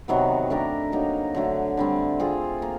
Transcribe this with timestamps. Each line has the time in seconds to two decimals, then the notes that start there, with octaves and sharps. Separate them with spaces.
0.08 C3 D#3 F#3 B3
0.50 A3 D4 G4 A#4
0.92 F#3 A#3 D#4
1.35 D3 F#3 A3
1.77 D3 G3 C4
2.19 A3 C4 F4 G#4
2.62 A#3